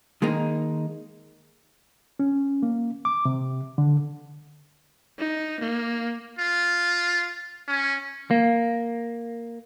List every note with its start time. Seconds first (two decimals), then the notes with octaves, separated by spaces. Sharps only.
0.22 D#3 G#3 A#3 D#4
2.20 C#4
2.63 A#3
3.05 D6
3.25 C3
3.78 D3
5.19 D#4
5.60 A#3
6.39 F4
7.68 C#4
8.31 A#3